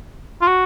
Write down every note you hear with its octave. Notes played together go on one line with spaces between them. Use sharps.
F4
F#4